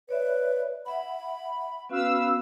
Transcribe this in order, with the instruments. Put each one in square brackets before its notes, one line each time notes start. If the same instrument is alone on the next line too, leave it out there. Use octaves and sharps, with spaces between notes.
[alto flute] B4 [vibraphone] C#5 D5 E5
[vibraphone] E5 F#5 [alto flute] B5
[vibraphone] B3 C#4 F#4 [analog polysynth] B4 F5 E6